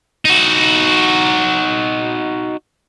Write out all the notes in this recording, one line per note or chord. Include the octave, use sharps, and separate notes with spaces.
D#4 F#4